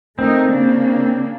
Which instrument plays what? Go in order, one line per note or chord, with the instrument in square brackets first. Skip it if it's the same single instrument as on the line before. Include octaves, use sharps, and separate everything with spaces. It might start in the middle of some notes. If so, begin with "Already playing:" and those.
[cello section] A3 D#4 A#4 [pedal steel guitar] C4
[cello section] C#3 A#3 D4